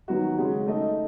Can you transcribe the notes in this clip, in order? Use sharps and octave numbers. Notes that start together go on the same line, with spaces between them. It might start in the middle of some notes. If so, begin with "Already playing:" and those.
D#3 F#3 B3 F#4
C#3 G#3 C#4 F#4
A3 D#4 A4 D#5